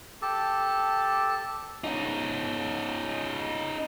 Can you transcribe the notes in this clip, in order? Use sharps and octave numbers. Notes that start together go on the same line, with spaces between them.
G4 A4 A5
C#4 D#4